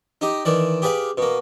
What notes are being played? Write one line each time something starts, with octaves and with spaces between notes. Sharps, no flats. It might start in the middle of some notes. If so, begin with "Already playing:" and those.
D#4 G4 D#5
D#3 E3 D5
G4 G#4 B4 D5 F5
B2 A#3